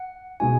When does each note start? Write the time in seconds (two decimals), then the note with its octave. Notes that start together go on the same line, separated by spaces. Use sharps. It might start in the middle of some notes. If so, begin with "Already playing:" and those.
Already playing: F#5
0.40 B2 G#3 D#4 F#4 G#5